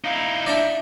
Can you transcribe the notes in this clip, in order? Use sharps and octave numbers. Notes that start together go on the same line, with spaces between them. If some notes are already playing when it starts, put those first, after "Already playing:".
D#4 E4 F5
D4 D5 E5